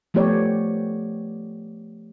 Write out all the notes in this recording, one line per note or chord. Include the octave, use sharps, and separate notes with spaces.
F3 A3 B3 G4 C#5 D5